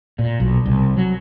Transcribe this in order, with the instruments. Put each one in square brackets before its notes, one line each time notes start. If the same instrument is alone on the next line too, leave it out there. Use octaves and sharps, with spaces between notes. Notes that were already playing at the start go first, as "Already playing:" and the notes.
[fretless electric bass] A#2
B1
C2
F#3